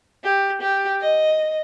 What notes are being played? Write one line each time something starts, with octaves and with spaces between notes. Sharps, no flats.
G4
G4
D#5